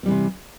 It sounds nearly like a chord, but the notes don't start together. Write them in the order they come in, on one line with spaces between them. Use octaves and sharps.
C4 G3 E3 C3